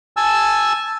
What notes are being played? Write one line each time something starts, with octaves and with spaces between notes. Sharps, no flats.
G#5 A5 E6